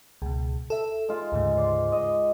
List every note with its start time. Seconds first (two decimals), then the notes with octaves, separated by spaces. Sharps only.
0.22 C#2 B2
0.70 A4 E5
1.09 G#3 F4
1.32 D2 G#2 C#3
1.57 C5 D5
1.92 D#5